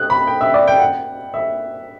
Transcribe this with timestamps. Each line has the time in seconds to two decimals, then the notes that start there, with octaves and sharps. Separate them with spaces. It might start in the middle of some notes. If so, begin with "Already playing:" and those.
Already playing: F#6
0.10 B5
0.27 G5
0.41 E5
0.54 D5
0.68 G5
0.80 F#5
1.34 E5